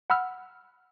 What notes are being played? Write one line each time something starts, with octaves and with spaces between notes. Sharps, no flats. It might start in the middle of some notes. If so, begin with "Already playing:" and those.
F#5 B5 E6 F6